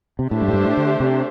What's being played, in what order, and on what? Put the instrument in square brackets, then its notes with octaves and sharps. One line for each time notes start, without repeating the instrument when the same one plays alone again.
[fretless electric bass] C3
[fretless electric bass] A2 [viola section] A3 D4 G4 C5 E5
[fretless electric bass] G2
A2
G2
A2
D3
C3